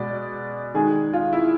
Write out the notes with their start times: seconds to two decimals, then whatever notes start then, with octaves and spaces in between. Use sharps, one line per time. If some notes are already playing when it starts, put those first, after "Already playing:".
Already playing: B2 G#3 D5
0.74 D#3 G#3 G#4
1.13 F4
1.33 E4